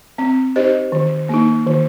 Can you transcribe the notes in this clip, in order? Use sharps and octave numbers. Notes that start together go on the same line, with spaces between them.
C4
D#4 G4 C5 D#5
D#3
A#3 D#4
D#3